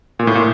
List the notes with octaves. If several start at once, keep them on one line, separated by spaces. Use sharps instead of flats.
A#2
A2
A#2